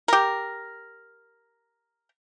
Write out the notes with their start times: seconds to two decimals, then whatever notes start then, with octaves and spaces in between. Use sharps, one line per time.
0.08 G4 A#4